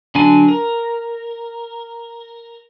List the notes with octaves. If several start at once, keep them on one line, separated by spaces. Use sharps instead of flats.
D3 F#3 D4 G#5
A#4